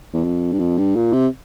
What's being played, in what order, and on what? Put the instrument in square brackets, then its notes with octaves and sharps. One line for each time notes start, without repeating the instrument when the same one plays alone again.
[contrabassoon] E2
F2
G2
F2
G2
A#2
C3